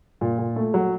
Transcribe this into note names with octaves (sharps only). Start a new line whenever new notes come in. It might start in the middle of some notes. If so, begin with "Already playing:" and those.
A#2
A#2
A3
F#3